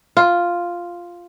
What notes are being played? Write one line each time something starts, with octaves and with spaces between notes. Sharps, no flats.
F4